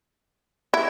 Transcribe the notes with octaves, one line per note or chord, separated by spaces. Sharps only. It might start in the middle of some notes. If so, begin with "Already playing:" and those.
E4